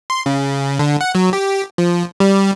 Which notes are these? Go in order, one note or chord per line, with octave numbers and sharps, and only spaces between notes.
C6
C#3
D3
F#5
F#3
G4
F3
G3